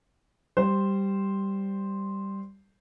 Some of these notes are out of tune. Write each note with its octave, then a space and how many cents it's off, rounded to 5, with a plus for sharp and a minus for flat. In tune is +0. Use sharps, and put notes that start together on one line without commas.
G3 +0 C5 +0